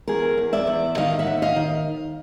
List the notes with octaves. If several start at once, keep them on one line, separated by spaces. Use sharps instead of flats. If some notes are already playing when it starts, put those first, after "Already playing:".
E2 G#4 A#4
E2
D5 E5
E2
D#3 D#5 F5
E5 F#5
D#2
D#5 F5
D#3